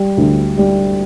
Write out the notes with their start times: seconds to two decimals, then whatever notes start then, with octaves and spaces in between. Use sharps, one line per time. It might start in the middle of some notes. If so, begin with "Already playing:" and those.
Already playing: G3
0.17 D2
0.58 G3